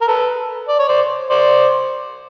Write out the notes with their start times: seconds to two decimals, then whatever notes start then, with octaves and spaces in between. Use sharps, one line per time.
0.01 A#4
0.08 A4 B4
0.69 D5
0.79 C#5
0.89 C5 D5
1.30 C5 D5